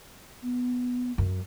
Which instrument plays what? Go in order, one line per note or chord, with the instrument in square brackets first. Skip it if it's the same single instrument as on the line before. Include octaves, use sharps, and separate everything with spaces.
[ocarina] B3
[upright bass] F#2